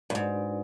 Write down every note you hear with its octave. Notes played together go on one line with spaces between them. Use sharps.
G2
G#2 D4 F#4 B4 D5